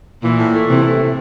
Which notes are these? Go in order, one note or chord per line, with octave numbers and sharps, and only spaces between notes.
A#2 E3
A2
A3
C3 E3
A3
A2